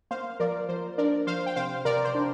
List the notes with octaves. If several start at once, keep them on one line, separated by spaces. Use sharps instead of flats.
A#3 C5 F5
F3 A#4 D5
F3 C5
D4 A#4 D5
F3 C5 F5
G5
C3 C5 F5
C3 A#4 D5
C5
D4